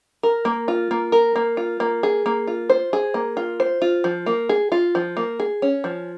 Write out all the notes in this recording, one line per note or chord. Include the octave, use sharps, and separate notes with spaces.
A#4
A#3
F4
A#3
A#4
A#3
F4
A#3
G#4
A#3
F4
C5
G#4
A#3
F4
C5
F4
F3
A#3
G#4
F4
F3
A#3
G#4
C#4
F3